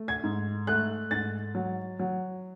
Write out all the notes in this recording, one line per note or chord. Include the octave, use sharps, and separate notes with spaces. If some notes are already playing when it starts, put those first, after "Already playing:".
Already playing: A3
G#6
G#2
A3 F#6
G#2 A6
F#3
F#3